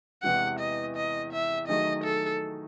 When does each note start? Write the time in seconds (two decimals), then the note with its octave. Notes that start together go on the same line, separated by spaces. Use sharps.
0.22 E2 C3 E3 G#3 F#5
0.59 D#5
0.96 D#5
1.32 E5
1.68 D#3 F#3 A3 D#4 G#4 D#5
2.04 A4